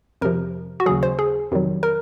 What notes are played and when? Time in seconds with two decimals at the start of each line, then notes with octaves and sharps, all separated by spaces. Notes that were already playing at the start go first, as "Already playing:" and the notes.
0.21 F2 C3 F3 A#4
0.80 F#4
0.86 D#2 C#3 F#3 G#4
1.03 C5
1.19 G#4
1.51 F2 C3 D#3 F#3
1.83 A#4